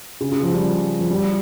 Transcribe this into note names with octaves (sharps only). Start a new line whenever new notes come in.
C#3
C#3
F3
G3
F3
G3